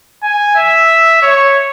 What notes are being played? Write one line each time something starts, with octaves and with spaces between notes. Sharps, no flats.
G#5
E5
C#5